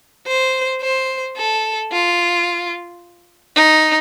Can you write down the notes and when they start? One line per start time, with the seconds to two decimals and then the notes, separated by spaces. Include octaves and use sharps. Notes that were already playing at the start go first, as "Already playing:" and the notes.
0.27 C5
0.82 C5
1.37 A4
1.92 F4
3.56 D#4